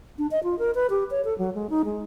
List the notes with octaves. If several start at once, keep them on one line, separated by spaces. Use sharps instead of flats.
D4
D#5
F4
A#4
B4
G4
C#5
A4
F#3
G#3
D#4
G#3